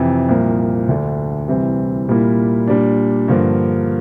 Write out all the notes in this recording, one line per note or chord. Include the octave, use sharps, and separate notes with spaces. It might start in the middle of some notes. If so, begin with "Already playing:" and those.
Already playing: F2 C3 E3
C2 A#2 F3 A#3
D2 D3 A3 D4
C2 C3 E3 G3 C4
A#2 G3 A#3 E4
A#2 G3 D4
G2 D3 F3 A#3